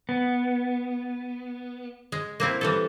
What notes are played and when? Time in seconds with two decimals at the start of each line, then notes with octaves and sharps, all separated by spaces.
0.09 B3
2.12 G#3
2.40 A#3 C4 E4
2.61 E3 G3 A4